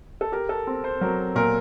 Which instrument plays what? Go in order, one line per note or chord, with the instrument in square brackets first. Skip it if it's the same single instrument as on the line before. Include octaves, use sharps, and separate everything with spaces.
[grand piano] A4
[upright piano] G4 [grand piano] A#4
[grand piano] A4
[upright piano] C4
[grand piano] C5
[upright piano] F#3 [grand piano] A#4
[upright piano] A#2 [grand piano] A#4